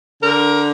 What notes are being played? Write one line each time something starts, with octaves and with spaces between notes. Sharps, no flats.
D3 A#4